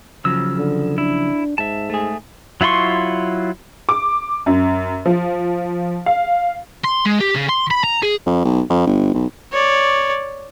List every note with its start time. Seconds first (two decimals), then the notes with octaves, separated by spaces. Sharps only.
0.25 C#3 F3 F#3 E6
0.58 D3
0.98 D4 E4
1.58 G#2 E5 A5
1.90 A3 G#4
2.61 F#3 E4 F4 C6 C#6
3.89 D6
4.46 F#2
5.06 F3
6.06 F5
6.84 C6
7.06 G#3
7.20 G4
7.35 C#3
7.49 C6
7.71 B5
7.84 A#5
8.03 G#4
8.26 F2
8.45 B1
8.70 F2
8.87 G1
9.14 B1
9.53 C#5 D5